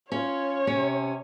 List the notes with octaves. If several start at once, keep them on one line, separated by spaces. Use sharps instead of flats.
C#4 F4 C#5
C3 C#4